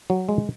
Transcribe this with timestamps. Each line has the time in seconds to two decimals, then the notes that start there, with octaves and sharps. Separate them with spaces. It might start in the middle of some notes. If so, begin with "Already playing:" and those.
0.10 F#3
0.29 G#3